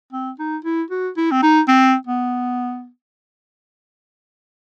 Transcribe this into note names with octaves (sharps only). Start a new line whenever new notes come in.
C4
D#4
E4
F#4
E4
C4
D#4
C4
B3